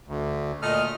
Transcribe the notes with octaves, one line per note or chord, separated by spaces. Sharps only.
D2
A#2 A3 D#5 F6